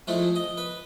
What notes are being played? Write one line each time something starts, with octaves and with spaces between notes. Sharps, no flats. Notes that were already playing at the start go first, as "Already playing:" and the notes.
F2 G#3 A3 E4
D#5
B4